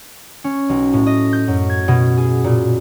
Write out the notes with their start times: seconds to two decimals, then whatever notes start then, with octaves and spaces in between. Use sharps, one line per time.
0.44 C#4
0.69 B1
0.93 A2
1.06 D#5
1.33 G6
1.48 F#2
1.70 G#6
1.88 B2
2.17 G#4
2.44 A#2